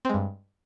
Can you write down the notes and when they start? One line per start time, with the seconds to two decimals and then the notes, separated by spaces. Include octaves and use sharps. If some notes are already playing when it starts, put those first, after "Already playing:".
0.05 C4
0.09 G#3
0.14 G2